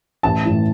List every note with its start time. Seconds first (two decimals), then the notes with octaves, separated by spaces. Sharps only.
0.23 A1 A5
0.45 A2 E3